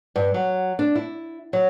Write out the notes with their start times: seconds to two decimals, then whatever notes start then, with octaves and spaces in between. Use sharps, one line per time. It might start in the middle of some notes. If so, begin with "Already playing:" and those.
0.16 G2
0.34 F#3
0.79 D4
0.95 E4
1.53 F#3